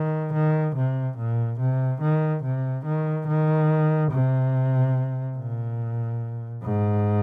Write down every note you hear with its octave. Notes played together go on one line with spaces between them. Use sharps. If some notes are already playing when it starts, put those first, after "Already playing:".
Already playing: D#3
D#3
C3
A#2
C3
D#3
C3
D#3
D#3
C3
A#2
G#2